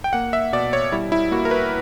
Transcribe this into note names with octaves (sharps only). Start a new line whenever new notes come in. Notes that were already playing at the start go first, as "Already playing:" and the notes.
G5
A#3 F#5
E5
B2 D5
C#5
G3 E4
E4
A#3 F#4
A#4
B4